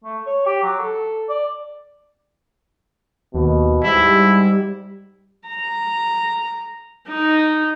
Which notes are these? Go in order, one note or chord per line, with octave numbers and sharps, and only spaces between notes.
A3
C#5
G4
F#3
A4
D5
D#2 B2
G#2 G3 E4
A#5
D#4